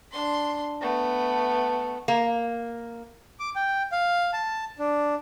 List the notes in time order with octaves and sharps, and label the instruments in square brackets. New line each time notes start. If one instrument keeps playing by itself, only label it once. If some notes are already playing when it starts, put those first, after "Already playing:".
[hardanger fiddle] D4 C6
A3 B3
[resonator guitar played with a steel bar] A#3
[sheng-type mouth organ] D6
G5
F5
A5
D4